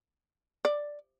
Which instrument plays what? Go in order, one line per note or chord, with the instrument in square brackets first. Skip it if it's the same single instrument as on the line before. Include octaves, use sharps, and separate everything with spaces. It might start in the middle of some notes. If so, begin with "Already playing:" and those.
[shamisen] D5